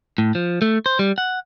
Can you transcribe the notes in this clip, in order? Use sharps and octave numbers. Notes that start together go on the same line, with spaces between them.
A2
F3
A3
C5
G3
F#5